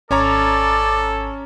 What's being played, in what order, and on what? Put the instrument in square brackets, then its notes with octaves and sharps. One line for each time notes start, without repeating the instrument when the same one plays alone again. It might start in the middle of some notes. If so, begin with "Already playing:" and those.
[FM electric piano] G#1 [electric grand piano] C#4 C#5 A#5 [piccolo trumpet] A4 [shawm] D5